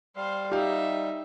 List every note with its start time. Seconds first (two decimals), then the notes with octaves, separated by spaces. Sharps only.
0.16 G3 C5 F5
0.51 D#4 G4 E5 F5